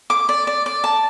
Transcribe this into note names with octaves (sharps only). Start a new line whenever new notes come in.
D6
D5
D5
D5
A5